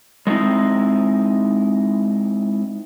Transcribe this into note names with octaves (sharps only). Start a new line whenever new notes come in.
G#3 A3 C4 D#4 E4